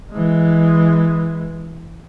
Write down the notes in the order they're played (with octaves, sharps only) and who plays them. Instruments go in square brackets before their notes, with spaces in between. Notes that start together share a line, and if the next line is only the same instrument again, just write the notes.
[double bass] E3 G#3